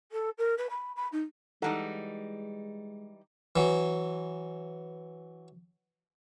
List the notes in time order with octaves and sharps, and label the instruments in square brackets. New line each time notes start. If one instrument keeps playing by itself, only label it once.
[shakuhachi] A4
A#4
B4
B5
B5
D#4
[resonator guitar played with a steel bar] E3 G3 D#4 [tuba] G#3 [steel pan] A4 F#5 A#5
[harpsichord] E3 F#3